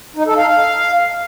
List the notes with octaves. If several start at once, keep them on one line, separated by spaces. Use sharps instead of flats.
D#4
A4
F5
F5